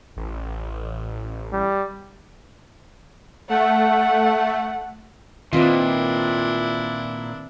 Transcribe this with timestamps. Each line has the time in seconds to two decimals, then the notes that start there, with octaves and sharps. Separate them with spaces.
0.17 A1
1.53 G3
3.49 A3 F#5
5.53 A#2 D#3 C4 D4 E4 F4 B4 D#5